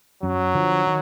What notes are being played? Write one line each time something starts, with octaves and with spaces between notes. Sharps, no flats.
F#2 F#3
D3 F3
D#3